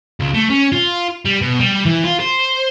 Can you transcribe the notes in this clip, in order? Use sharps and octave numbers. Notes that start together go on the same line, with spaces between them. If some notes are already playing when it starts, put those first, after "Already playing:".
C#2
A3
C#4
F4
G3
B2
G3
E3
F4
C5